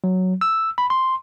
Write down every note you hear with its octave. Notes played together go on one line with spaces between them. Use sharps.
F#3
E6
B5
C6